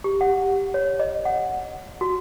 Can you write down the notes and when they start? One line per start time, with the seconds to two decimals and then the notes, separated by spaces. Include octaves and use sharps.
0.04 G4
0.21 F#5
0.74 C#5
0.99 D#5
1.25 F#5
2.01 F#4